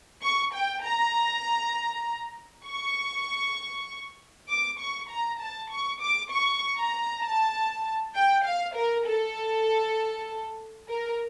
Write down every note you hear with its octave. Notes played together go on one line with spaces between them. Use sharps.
C#6
G5
A#5
C#6
D6
C#6
A#5
A5
C#6
D6
C#6
A#5
A5
G5
F5
A#4
A4
A#4